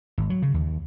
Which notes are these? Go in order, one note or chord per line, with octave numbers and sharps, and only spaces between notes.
G#1
F#3
C#3
D#2